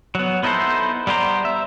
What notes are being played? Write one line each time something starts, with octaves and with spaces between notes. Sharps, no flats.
F#3 B3
B3 D#4 E4 A4 C5
G3 B3 G4 C5 A#5
E5